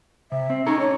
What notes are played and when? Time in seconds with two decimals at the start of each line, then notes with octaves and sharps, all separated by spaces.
0.32 C3 E5
0.50 C4
0.66 C#4 D#4 A4 A#5
0.79 C#5